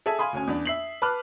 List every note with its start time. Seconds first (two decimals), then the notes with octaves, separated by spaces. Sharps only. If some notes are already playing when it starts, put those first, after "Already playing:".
0.06 G#4 A4 E5 G#5
0.19 F5 G#5 B5 C6 D#6
0.33 D2 C#4 G#5
0.48 E2 D4
0.65 E5 C7 F#7
1.02 B4 A5 B5 D6 F6 F#6